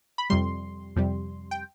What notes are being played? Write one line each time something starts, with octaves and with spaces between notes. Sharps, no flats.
B5
F2 C3 G3 C6
F2 C3 G3
G5